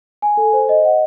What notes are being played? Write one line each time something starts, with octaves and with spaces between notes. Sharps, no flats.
G#5
A4
C5
D#5
F#5